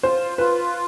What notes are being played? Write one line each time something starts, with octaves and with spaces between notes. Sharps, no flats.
F4 C5
F4 B4